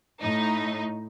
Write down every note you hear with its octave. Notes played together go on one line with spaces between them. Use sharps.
A2 D#4